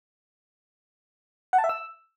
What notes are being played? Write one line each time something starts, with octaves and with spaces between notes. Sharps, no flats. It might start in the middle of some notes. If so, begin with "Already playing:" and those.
F#5
A5
E5
E6